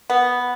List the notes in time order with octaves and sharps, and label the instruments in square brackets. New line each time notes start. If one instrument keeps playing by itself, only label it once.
[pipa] B3